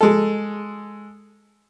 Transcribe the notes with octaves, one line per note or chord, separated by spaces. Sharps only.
G#3 A4